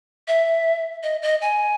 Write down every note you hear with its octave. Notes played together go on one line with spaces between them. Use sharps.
E5
D#5
D#5
G#5